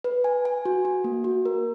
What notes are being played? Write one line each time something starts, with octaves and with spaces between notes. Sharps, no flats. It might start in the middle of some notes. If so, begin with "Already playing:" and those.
B4
G#5
G#5
F#4
F#4
A#3
F#4
A#4